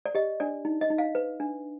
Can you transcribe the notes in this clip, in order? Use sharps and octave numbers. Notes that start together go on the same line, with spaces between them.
D5
G4 D#5
D4 D5
D#4
D#5
D#4
F5
B4
D4